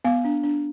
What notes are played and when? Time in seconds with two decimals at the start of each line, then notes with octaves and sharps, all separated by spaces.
0.05 B3 F5
0.25 D4
0.43 D4